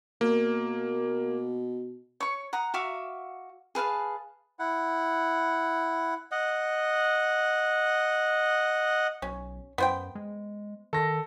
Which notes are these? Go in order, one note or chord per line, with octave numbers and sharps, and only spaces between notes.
B2 A#3
C#5 C#6
F#5 A#5 D#6
F#4 E5 F5 D6
G#4 B4 F5 A5
E4 F#5
D#5 F#5
B1 C#4
F#2 B3 C5 G5
G#3
D#3 A4 A#6